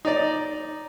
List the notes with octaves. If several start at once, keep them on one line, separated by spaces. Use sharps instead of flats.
D#4 D5